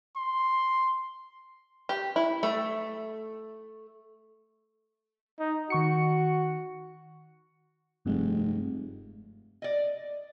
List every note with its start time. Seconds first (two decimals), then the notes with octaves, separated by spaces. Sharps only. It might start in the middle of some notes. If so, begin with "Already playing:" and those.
0.16 C6
1.89 G4
2.16 E4
2.43 A3
5.40 D#4
5.70 D#3 F#4 C#6 C#7
8.06 F1 G2 G#3
9.62 D5 D#5